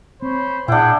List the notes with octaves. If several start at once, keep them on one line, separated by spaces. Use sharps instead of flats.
C4 C5 C#5 B5
A#2 D4 E4 G#4 F#5 G5